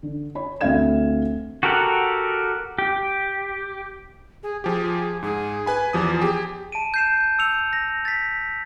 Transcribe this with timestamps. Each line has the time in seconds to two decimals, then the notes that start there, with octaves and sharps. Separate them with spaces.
0.03 D3
0.35 C#5 B5
0.61 D2 C4 E5 F5 G#6 E7
1.63 F#4 G4 A4 A#4 F#5
2.79 G4
4.43 G#4
4.64 F3 G4 G#4
5.23 G#2 G#4
5.66 B4 G#5 B5
5.93 E2 F3 G4 D#6
6.21 G4 G#4
6.72 A5 D7 D#7
6.94 G6 C7 E7
7.39 E6 C#7 F7
7.73 A#6
8.05 A6 B6